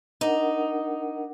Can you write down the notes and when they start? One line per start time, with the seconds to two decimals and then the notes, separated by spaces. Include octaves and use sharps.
0.21 D4 D#4 A#4 F#5